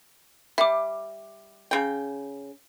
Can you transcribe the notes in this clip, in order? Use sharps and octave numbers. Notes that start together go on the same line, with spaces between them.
G3 E5 D6
C#3 G5